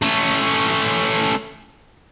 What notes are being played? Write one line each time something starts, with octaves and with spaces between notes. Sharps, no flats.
A3 C#4